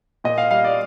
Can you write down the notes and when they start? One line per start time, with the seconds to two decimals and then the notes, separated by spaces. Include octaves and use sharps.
0.24 A#2 D#5
0.38 F5
0.51 G3 F5
0.64 D5